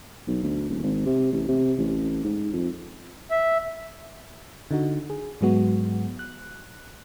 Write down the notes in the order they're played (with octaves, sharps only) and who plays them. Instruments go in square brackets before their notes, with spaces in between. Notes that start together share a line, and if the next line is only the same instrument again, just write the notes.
[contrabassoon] B1
D2
D#1
G#1
C3
A1
C3
A1
G#2
F2
[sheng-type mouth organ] E5
[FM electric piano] D3 D#4 F#4
G#4
G#2 F#3 G#3 B3 F#4
F#6